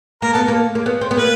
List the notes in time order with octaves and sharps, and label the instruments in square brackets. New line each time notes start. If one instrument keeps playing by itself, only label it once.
[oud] A#3 [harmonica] A#4
[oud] B3 [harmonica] A4
[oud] A#3
A#3
B3
C4
B3
[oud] A#3 [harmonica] B4